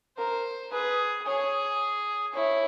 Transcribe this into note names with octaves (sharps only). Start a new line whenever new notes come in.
A#4 C5
G#4 B4
G#4 C#5
E4 C#5